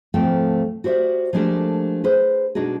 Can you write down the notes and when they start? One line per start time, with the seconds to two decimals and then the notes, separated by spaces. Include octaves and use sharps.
0.14 D2 G#2 F3 A3 C4 G5
0.84 F#4 G4 C5 D5 E5
1.33 F3 G#3 A3 D4 G4 A#4
2.04 G#4 B4 C5
2.55 B2 G#3 D4 D#4 F#4 G#4